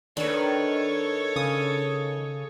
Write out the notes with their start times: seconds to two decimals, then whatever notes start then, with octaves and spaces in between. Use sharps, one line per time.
0.17 D#3 D4 A4 B4 C#5
1.36 C#3 D#6